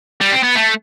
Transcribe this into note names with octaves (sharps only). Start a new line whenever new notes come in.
G3
C4
B3
A3